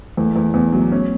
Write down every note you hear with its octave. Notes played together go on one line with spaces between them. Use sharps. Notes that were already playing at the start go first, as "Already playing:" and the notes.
E2 A3
E2
E2 B3
F#3
C#4